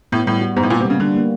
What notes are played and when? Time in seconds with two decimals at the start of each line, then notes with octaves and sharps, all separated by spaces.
0.12 A2 B3
0.27 A2 G3
0.42 F#4
0.56 G#2 B3
0.63 A2
0.70 A#2 A#3
0.80 C3
0.86 C#3 G3
0.99 D3 G3
1.15 A#3